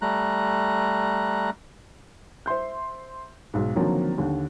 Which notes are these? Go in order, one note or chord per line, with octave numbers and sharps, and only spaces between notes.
G3 A3 A#5 F#6
C5 E5 C6 G6
B1 G#2
D3 D#3 F3 F#3 A#3 C4
D#2 D3